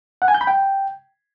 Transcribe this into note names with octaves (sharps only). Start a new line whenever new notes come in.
F#5
G#5
G6
B5
G5